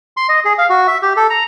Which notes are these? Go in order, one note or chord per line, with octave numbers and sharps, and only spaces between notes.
C6
D#5
G#4
F5
F#4
E5
G4
A4
A#5